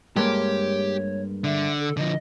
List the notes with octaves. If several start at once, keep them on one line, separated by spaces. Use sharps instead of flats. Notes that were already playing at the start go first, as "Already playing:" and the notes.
G2 G#3 A#3 G4 C#5
D3 E5
A4
D3 F3 D#5